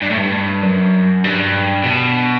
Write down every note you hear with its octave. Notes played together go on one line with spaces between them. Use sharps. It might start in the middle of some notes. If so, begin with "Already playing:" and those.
G2
A2
G2
F#2
G2
B2